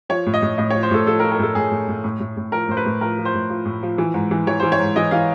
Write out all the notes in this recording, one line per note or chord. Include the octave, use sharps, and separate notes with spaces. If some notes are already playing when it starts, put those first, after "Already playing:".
F3 C#5
A2
D#5
A2
A2 D#5
C#5
F3
C5
A2 A4
F3 A4
A#4
F3
A#4
A2 A4
A2 G#4
A2
A2
A2
A2
A2
F3 A#4
A2 C5
B4
A2
F3 A#4
F3
C5
A2
F3
A2
F3
E3
G#2
E3
E3 C#5
C5
E3
C#5
G#2
E3 D#5
E3 F5